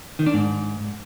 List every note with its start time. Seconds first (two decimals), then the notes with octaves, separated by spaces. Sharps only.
0.19 D#3
0.26 D4
0.34 G#2